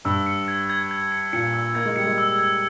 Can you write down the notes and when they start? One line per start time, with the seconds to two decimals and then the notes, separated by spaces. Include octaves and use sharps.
0.05 G2 E6
0.26 C#7
0.48 G#6
0.70 G#6
0.91 G#6
1.12 C#7
1.33 A#2 C#7
1.54 E6
1.75 A#3 G#6
1.86 G#3
1.96 G3 C#7
2.06 G#3
2.18 E6
2.39 G#6